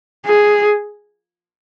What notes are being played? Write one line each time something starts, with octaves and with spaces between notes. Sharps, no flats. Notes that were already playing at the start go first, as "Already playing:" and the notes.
G#4